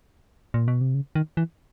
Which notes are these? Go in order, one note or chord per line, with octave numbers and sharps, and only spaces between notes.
A#2
B2
C3
C#3
D#3
E3